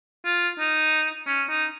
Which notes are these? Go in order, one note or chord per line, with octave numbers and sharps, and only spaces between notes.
F4
D#4
C#4
D#4